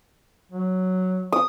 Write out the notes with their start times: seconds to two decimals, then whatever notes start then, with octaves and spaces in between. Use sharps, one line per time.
0.52 F#3
1.32 D#6